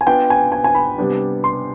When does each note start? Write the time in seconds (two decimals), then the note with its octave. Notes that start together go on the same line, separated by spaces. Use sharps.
0.01 G#5
0.06 B3 D4 F4 B4 G5
0.30 G#5
0.52 G#5
0.64 G#5
0.75 B5
0.98 C3 G3 B3 D4
1.44 C6